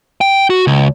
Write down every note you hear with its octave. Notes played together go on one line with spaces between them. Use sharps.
G5
F#4
C#2